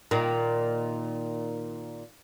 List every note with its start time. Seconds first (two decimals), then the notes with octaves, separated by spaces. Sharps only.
0.11 A#2 D#3